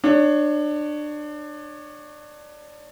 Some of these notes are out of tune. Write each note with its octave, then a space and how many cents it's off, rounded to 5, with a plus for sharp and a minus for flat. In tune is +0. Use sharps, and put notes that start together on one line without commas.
D4 +25 C#5 +5